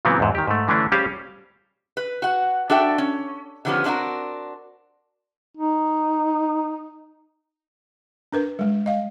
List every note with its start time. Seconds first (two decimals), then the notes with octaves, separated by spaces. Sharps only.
0.05 A#2 C#3 E3 F#3 B3 C4
0.20 E2 G#2
0.35 D#3 G4
0.47 G#2 A3
0.68 D3 E3 A3 C#4 D4
0.92 G3 C#4 G4 G#4 C5 F5
1.97 B4
2.22 F#4 F#5
2.70 D4 F#4 A4 E5 G5
2.98 C#4
3.65 D3 D#3 F3 G3 B3 C#4
3.84 C4 D4 D#4 F#4 A#4
5.57 D#4
8.32 D4 A#4 B4
8.59 G3 G#3
8.86 D#5 F5